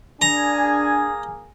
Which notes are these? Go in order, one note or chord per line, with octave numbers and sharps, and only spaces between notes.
A#3 D4 G#4 G#5 A#5